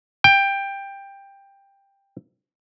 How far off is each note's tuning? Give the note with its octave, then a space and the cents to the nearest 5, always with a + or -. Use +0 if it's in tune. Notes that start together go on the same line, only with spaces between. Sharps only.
G5 +15